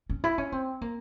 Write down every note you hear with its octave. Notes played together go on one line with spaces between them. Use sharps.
C#4
E4
C#4
C4
A#3